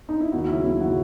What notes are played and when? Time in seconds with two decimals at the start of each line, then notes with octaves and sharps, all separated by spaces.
0.09 D#4
0.21 E4
0.32 D#2 F#4
0.49 C#3 F#3 E4
0.64 D#2 E4
0.81 C#3 F#3 F#4